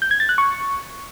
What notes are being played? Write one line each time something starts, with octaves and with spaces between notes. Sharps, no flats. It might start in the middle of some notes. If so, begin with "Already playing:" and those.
G6
G#6
A6
F#6
C#6